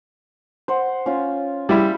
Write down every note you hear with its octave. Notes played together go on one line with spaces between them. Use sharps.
C5 F#5
C#4 F4
G3 E4